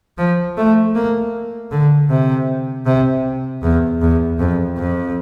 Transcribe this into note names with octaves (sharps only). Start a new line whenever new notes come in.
F3
A3
A#3
D3
C3
C3
E2
E2
F2
F2